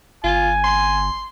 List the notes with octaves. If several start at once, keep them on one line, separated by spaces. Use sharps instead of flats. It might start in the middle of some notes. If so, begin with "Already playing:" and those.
G1 F4 G#5
C6